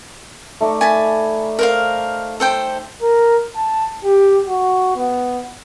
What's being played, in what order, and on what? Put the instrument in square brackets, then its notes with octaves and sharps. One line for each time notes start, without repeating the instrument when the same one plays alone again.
[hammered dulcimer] A3 D#4 D5
[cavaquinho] G#5 A5 B5
A#4 C5 F5
A4 C5 G5
[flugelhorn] A#4
A5
G4
F#4
B3